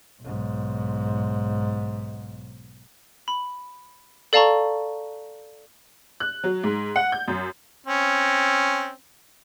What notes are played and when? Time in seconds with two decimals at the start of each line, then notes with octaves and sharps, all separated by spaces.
0.21 B1 G#2
3.28 B5
4.33 A4 D5 F5 A5 A#5 C#6
6.20 F#6
6.44 F#3
6.64 G#2
6.96 F#5
7.12 G6
7.28 F#2
7.87 C4 C#4